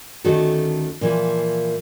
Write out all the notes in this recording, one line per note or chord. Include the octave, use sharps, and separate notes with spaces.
D2 D#3 A3 C#4 F#4 A4
A#2 E3 F3